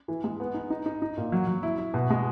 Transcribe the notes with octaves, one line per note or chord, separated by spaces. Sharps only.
E3
G#3
B3
D#4
D#4
D#4
D#4
A#2
F#3
F#3
E4
E4
B2
G#3